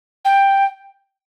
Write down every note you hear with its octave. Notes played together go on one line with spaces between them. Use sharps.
G5